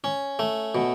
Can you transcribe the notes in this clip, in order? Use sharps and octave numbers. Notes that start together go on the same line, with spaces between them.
C#4
A3
B2